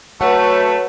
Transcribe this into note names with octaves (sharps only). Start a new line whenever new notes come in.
F#3 A3 B4 C#5 F#5